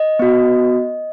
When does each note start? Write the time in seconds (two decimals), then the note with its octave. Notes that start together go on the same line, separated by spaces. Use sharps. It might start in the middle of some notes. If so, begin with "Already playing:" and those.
Already playing: D#5
0.19 B3 F#4